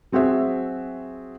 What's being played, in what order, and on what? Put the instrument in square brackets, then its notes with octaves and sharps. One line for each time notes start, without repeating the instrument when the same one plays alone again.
[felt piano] F#3 C4 F#4 G#4 E5